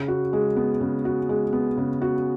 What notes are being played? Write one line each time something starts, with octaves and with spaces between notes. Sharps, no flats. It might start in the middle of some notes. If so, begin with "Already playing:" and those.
Already playing: C#3
F#4
G#3
B3
C#3
F#4
G#3
B3
C#3
F#4